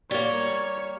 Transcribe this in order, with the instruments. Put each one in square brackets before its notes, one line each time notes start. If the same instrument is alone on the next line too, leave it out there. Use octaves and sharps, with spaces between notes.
[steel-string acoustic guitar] G3 A#3 [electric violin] C#5